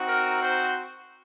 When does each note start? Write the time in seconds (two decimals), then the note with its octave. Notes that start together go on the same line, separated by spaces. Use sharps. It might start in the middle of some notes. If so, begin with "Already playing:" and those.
Already playing: C4 D#4 F#4
0.08 A#4
0.42 C5